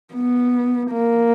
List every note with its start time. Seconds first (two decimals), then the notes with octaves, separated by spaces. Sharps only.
0.14 B3
0.91 A#3